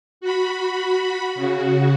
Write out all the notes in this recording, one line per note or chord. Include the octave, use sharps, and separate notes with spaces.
F#4 B5
C#3 F#4